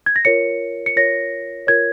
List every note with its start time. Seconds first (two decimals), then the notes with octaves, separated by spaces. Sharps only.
0.06 G#6
0.16 A#6
0.25 F4 A#4 C#5 C#7
0.86 C#7
0.96 F4 A#4 C#5 A#6
1.67 F4 A#4 C#5 G#6